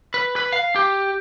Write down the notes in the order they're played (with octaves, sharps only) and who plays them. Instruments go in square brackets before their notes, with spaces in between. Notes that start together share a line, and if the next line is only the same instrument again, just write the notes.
[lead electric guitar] B4
B4
F5
G4